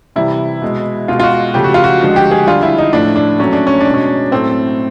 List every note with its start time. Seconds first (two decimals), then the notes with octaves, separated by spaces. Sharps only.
0.16 C3 E3 G3 E4
0.62 B2 G#3
1.08 B2 G#3 F4
1.20 F4
1.24 F#4
1.54 C#3 F3 A3 G4
1.64 F#4
1.74 F4
1.84 F#4
2.01 D3 F3 G#3 F#4
2.16 G4
2.31 G#4
2.47 D3 G3 F4
2.63 E4
2.78 D#4
2.93 A2 F3 A3 D4
3.16 D4
3.39 A#2 F#3 A3 C#4
3.53 D4
3.67 C#4
3.81 G#3 D4
3.91 B2 C#4
4.31 A2 F#3 A3 C4